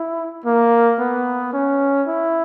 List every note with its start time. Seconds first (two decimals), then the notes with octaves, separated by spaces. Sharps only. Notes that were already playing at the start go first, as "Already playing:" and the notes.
Already playing: E4
0.45 A#3
0.99 B3
1.53 C#4
2.07 E4